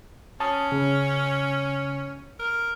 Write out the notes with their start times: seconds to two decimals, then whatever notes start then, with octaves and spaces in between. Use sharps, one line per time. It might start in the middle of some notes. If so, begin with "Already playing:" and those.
0.40 C#4 A5 D#6
0.72 C#3
2.39 A#4